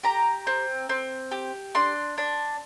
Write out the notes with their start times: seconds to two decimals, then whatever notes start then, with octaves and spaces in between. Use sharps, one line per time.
0.03 G4 A#5
0.47 C4
0.89 C4
1.31 G4
1.75 D4 C6
2.18 D4